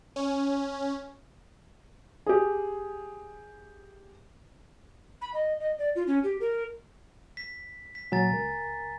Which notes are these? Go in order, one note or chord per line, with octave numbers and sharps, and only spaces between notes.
C#4
G4 G#4
B5
D#5
D#5
D5
F4
C#4
G4
A#4
B6
B6
A#2 F#3 G#5 A#5 A6
C#2 A#4